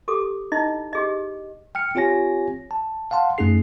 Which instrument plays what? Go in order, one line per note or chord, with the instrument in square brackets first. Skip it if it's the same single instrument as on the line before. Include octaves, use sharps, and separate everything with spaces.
[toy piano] G4 A4 D6
D#4 E4 D#5
G4 G#4 D#5
[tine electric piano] G5 F6 C#7
C4 F4 G4 C#5 G#5 A#6
A5
F5 F#5 A5 C6
F#2 A3 C#4 D#4 G#4 C7